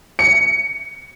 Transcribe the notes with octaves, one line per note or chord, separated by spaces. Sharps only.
C#7